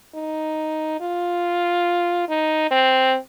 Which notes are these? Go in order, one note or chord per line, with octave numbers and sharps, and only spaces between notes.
D#4
F4
D#4
C4